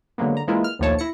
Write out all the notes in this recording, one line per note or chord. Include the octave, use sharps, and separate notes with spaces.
D3 F#3 G#3 A#3 B3
D3 A#5
E3 G#3 A#3 E4 F4 A#4
F6
A#1 D#2 F3 A3 C#5 A5
E4 A#6 C#7